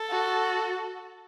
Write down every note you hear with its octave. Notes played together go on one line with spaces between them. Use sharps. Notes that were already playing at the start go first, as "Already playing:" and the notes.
Already playing: A4
F#4